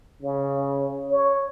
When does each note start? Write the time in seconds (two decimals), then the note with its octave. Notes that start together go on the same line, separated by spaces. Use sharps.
0.22 C#3
1.11 C#5